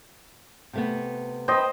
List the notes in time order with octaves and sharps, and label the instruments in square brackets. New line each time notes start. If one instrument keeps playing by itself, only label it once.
[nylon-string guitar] C3 A3 B3
[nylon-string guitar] B4 G5 [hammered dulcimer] C5 D#5